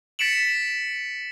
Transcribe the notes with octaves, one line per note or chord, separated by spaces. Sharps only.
A6 B6 C#7 D7 E7 F#7